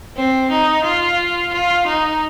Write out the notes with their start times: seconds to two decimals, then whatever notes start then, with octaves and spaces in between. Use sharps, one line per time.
0.16 C4
0.51 D#4
0.84 F4
1.53 F4
1.86 D#4